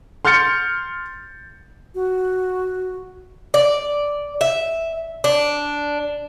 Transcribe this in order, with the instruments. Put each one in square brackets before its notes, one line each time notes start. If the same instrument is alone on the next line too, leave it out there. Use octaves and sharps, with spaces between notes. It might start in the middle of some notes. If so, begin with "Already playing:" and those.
[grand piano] C6 F6 G6 A6 C#7
[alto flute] F#4
[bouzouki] D5
E5
D4